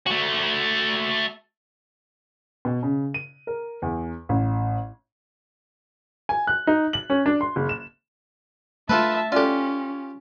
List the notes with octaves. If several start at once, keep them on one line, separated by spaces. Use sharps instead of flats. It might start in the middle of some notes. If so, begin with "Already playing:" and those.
A3 F#4
B2
C#3
D#7
A#4
E2
A1
G#5
F#6
D#4
F#7
C#4
D4
C6
F#1
E7
A3 D4 F4 A4 B4 E5 A5
C#4 F4 G4 A4 D5